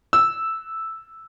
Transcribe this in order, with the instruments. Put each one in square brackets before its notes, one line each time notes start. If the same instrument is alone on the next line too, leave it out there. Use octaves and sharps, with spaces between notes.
[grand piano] E6